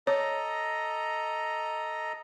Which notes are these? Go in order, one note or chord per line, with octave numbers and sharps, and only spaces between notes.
A4 C#5 D#5 A#5